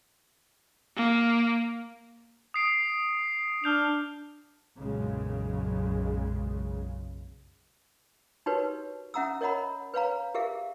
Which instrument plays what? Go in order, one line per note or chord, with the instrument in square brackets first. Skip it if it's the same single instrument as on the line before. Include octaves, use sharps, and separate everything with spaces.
[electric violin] A#3
[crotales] D#6 C7 D7
[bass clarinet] D4 [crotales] F6 G6 F7
[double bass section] B1 F#2 A#2 C#3 G#3
[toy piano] D#4 F#4 G4 A#4 B4 C#5
C#4 E5 F#5 A#5 D#6 E6
A#4 C#5 D#5 F#5 A#5 B5
B4 C#5 F5 A#5
G4 G#4 A#4 E5 F5